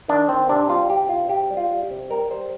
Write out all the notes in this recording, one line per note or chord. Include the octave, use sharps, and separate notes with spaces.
D#3 D4
D#3 C4
C3 D4
G3 F4
C3 G4
C3 F4
C3 G4
G3
F4
G3
G4
C3
G3 A#4
G3 C5